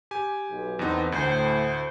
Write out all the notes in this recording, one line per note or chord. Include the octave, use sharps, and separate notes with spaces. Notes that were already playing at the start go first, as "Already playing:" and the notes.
G4 G#5
B1
E2 B3 C4 D#4 A4
D2 A2 C5